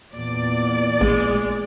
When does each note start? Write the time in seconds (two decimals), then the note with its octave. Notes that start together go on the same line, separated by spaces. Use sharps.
0.14 E2 A#2 D5
1.01 A1 G#3